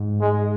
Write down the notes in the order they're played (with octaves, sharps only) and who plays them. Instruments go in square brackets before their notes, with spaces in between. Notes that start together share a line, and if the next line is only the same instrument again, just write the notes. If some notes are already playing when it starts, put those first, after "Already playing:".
Already playing: [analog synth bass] G#2
[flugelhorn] G#3